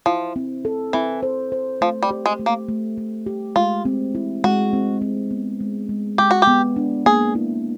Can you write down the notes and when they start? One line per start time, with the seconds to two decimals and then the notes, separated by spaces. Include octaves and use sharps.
0.06 F3 E4
0.36 C4
0.65 A4
0.93 E3 C4
1.23 C5
1.52 C5
1.81 F3 A3
2.02 G3
2.11 G4
2.26 G#3
2.39 A3
2.46 A#3
2.69 A3
2.98 A3
3.27 G4
3.56 G#3 F4
3.85 C4
4.15 E4
4.44 G#3 F#4
4.73 C4
5.02 C4
5.31 B3
5.60 G#3
5.89 G#3
6.18 G#3 G4
6.31 F#4
6.42 G4
6.47 B3
6.76 D4
7.06 A#3 G#4
7.35 E4